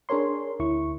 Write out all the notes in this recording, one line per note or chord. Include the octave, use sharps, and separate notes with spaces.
D4 G#4 A#4 C#5 C6
D2 E4 C#6